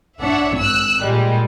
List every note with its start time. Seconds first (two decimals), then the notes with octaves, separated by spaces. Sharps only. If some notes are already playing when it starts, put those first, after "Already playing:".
0.21 D4 C#5 E5 F#5
0.58 G#1 E6 F#6
1.02 A#2 G3 G#3